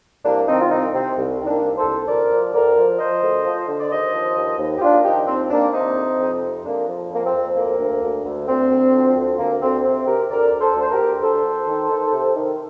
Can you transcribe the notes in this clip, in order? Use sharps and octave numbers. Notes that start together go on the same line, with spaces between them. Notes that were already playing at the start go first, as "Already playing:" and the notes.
C2 A#3 D4
D#3 C4 D#4
F4
C2 C4 D#4
C3 C4
C2
D#3
A#3 D4
C2
A4 C5
C2
D2 A#4 D5
F3
D2 A#4 D5
F3
F3 C5 D#5
D2
F3
D3
D5
D#2 C5 D#5
F3
D#2
D#2
G4
D#2 D4 F4
F3 D#4 G4
D#2 C4
D#2 A#3 D4
C3 C4 D#4
F2
F2
C3
F2 A#3 D4
F3
F2
A#3
C4
F2
D2 A#3
D2
D2
D2
D2 C4
D2
F3
D2
D2 A#3
D2 C4
C3 C4
C3 G4 A#4
D2 A#4 D5
D2
A4 C5
D2 C5
G4 A#4
D2
D2 A4 C5
D2
D#3
D#3
C3
D#3